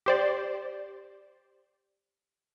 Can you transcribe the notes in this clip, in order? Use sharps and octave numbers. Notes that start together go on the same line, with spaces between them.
G4 C5 D5